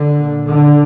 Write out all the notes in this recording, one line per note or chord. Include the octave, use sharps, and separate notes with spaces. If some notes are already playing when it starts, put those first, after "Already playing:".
Already playing: D3
A#2
D3